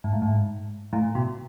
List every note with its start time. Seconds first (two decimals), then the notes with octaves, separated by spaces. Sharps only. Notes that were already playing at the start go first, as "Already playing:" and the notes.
0.04 G#2
0.13 A2
0.22 G#2
0.93 A2
1.15 B2